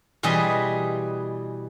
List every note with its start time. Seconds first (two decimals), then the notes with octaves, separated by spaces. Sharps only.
0.23 B2 E3 G3 G#4 D#5 C6